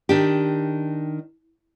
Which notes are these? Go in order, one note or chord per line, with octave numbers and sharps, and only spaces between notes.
D#3 D4 G4